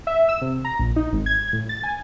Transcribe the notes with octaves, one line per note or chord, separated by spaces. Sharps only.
E5
E6
C3
A#5
A#1
D#4
G#1
G#6
A2
A6
G#5